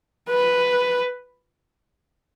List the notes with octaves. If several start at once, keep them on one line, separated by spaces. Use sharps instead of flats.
B4